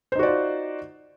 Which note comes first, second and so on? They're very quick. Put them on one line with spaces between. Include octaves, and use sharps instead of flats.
C5 D#4 F#4 D5 F4